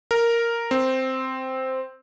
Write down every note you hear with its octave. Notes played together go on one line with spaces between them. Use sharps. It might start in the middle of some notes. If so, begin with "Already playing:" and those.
A#4
C4